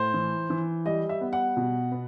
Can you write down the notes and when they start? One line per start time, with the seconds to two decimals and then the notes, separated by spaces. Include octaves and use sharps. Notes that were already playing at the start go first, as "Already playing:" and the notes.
Already playing: A2 C5
0.14 E3
0.50 E3
0.85 G3 D#5
1.09 E5
1.21 B3
1.33 F#5
1.57 B2
1.92 B3